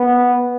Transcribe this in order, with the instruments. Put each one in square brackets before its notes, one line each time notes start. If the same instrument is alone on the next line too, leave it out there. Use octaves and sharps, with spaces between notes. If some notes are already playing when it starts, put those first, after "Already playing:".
Already playing: [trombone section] B3